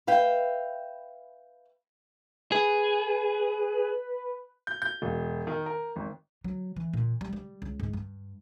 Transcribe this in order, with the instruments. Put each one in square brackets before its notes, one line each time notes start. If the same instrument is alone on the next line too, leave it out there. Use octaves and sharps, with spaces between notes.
[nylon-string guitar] B4 E5 F5 G5
[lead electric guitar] G#4 [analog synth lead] B4
[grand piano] G6
G6
E1
D#3
A#4
G#1
[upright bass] F#3
E3
A#2
G3
G3
C#2
G#2
G2